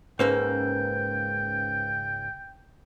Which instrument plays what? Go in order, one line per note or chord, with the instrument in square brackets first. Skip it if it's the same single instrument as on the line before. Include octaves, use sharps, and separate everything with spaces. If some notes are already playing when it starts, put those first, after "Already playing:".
[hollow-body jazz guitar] C#2 G#2 A#3 [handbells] C#4 B4 C5 [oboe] G5